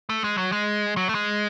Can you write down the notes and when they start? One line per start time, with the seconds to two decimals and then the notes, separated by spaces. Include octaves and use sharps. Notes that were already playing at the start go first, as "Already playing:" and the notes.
0.10 A3
0.24 G#3
0.38 F#3
0.52 G#3
0.97 F#3
1.09 A3
1.15 G#3